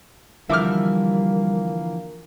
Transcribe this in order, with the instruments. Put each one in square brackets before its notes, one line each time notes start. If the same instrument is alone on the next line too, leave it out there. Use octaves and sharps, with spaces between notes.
[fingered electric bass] D3 E3 F3 [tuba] G3 [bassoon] A#3 [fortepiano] E5 D6 F6